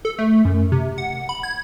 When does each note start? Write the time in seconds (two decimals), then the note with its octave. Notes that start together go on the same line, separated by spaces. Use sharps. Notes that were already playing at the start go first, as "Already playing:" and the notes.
0.05 A4
0.19 A3
0.45 F#2
0.72 C3
0.98 F#5
1.29 B5
1.43 G#6